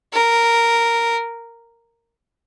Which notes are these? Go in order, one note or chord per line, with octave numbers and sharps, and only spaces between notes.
A#4